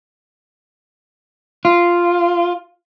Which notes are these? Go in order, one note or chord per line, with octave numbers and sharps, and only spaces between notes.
F4